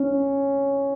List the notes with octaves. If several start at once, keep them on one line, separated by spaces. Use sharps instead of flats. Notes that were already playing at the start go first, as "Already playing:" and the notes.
Already playing: C#4